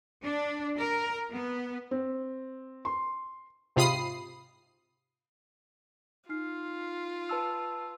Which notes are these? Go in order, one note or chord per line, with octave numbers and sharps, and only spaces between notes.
D4
A#4
B3
C4
C6
G#2 C3 F4 B5 D#6 C7
D#4 F4 F6 C7
B4 A5 E6